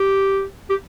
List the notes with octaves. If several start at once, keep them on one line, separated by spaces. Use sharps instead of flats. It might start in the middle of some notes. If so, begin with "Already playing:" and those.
Already playing: G4
G4